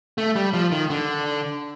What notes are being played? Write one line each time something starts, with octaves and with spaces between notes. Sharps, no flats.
A3
G3
F3
D#3
D3